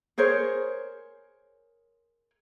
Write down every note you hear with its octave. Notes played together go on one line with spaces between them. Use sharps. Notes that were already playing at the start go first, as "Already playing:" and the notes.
G#4 A#4 C5 C#5